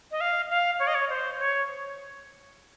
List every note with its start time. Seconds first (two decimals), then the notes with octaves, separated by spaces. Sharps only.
0.11 D#5
0.21 F5
0.50 F5
0.79 C#5
0.87 D#5
0.95 C#5
1.10 C5
1.39 C#5